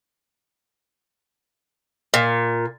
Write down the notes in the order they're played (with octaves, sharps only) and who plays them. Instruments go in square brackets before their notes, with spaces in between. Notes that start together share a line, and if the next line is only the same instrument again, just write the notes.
[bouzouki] A#2